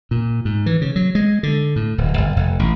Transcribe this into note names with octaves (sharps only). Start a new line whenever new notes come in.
A#2
G#2
E3
C#3
F#3
G#3
D3
A2
D1
G1
F1
A1